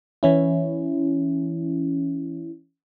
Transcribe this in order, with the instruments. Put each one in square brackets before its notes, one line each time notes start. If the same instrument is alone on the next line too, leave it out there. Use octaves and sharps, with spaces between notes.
[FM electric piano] E3 C#4 E4